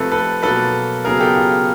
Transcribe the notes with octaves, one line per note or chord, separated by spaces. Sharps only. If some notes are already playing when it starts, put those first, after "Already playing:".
Already playing: C3 F3 A3 C4 A4 B4
A4 B4
B2 F#3 A#3 A4 B4
C#3 F#3 B3 G#4 A#4
G4 A4
F4 G4